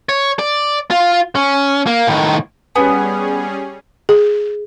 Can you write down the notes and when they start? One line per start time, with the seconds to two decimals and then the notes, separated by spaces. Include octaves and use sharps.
0.09 C#5
0.39 D5
0.91 F4
1.35 C#4
1.87 A#3
2.08 A2 D#3
2.76 G3 B3 C#4 G#4 G#5
4.09 G#4